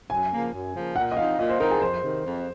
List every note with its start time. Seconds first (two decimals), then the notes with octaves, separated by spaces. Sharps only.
0.10 F#2 G#5
0.32 C#3 F3 A#3
0.53 F#2
0.75 C#3 F3 A#3
0.96 A#2 F#5
1.12 D#5
1.17 F3 C4 D#4 F5
1.39 A#2 D#5
1.49 C5
1.59 F3 C4 D#4 A#4
1.71 G#4
1.81 F2 C5
2.03 C3 D#3
2.24 F2